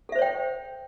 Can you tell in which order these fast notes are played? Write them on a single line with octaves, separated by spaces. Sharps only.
A4 E5 C5 C#5 G5